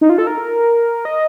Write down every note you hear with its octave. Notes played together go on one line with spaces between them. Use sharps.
D#4
F4
A4
A#4
D#5